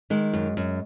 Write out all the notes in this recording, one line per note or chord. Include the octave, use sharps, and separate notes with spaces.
D#3 G#3
F#2
F#2